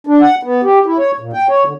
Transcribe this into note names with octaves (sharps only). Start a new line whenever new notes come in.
D4
F#5
B3
G4
E4
C#5
A#2
G5
C#5
D3